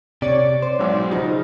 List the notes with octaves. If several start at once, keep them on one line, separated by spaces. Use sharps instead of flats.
C3 C#5 D5
C5
B1 G#2
C#3 F3 D#4